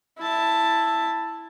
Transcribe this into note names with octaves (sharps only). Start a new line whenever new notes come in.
E4 A5